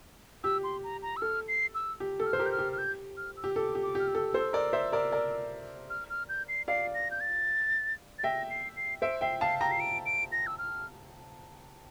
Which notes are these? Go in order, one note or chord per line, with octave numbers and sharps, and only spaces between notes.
G4 E6
C6
A#5
A#5
E6
A4 F6
C7
E6
G4
A4 E6
F6
C5
G4 A#4
G6
F6
G4
F6
G6
F6
E6
G4
A4 D6
G4
D6
G4 F6
E6
A4
A4 C5
A#4 D5
C5 E5
A#4 D5
A#4 D5
F6
F6
G6
C7
D5 F5 C7
A#6
G6
A6
A6
E5 G5 A#6
C7
C7
C5 E5 D7
E5 G5 C7
F5 A5 C7
G5 A#5 A#6
C7
D7
D7
A#6
E6
F6